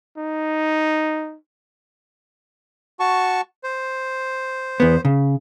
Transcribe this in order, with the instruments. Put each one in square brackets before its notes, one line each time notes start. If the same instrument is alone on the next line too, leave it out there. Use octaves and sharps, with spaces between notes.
[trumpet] D#4
[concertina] F#4 A5 C#6
C5
[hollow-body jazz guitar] E2 B3
C#3